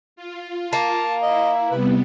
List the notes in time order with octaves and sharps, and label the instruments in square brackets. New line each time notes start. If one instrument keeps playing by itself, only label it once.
[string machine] F4
[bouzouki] A#3 [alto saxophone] A5
[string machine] E4 [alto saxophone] D#5
[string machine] C3 G3 B3 [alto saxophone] B4